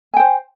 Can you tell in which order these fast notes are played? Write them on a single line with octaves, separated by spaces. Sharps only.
G#5 G5 C5